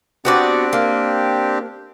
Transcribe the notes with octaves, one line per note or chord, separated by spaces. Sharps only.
B3 C4 D4 F#4 G4 D5
A#3